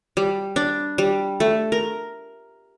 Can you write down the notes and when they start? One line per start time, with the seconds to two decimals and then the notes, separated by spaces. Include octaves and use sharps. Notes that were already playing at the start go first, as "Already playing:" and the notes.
0.17 G3
0.56 D4
0.98 G3
1.40 A3
1.72 A#4